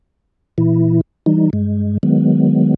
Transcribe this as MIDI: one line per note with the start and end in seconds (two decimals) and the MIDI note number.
0.58 1.01 46
0.58 1.01 52
0.58 1.01 64
1.26 1.50 52
1.26 1.50 55
1.26 1.50 63
1.53 1.98 43
1.53 1.98 56
2.03 2.74 51
2.03 2.74 54
2.03 2.74 56
2.03 2.74 59